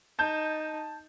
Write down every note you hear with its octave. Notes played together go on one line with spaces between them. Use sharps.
D#4 A5 G6